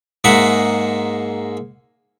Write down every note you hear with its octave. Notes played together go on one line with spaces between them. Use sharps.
G#2 G#3 A#3 E5 F#5